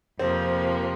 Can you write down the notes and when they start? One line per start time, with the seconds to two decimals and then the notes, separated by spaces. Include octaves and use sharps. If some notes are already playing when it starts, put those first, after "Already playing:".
0.19 F2 C3 F3 A#3 C4